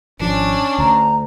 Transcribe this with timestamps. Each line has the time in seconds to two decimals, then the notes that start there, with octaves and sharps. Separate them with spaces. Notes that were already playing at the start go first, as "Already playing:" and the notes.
0.20 G#1 F3 C#4 D4
0.78 D2 A#5